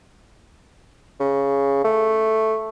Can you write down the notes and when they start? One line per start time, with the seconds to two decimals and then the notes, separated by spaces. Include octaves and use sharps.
1.20 C#3
1.84 A3